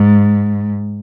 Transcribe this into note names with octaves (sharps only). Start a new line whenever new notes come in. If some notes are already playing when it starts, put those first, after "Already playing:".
Already playing: G#2